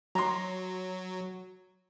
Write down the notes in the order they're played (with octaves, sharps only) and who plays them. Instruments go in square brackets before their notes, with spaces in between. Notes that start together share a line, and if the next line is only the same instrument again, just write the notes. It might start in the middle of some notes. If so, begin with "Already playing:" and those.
[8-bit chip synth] F#3 [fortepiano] A#5 C6